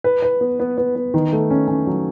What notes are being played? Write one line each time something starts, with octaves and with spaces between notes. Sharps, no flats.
B4
B4
B3
B3
B3
B3
D#3
A3
C#4
C#4
F#3